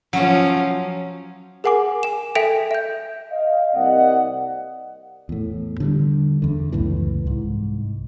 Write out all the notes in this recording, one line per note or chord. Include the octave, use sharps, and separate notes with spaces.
F3 F#3 C#4
G#4 A#4 F#5 G#5 D6
G#5 E7
A4 E5 G5 B6 D7 F7
E5 G6
D#5 F5
C2 C3 A#3 D5 D#5 F#5
E2 A2
D3 F3 G3
E2 D3
C#2 F#2 A2 E3
C2 G#2